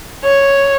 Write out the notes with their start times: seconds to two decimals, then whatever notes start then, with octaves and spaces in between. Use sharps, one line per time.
0.24 C#5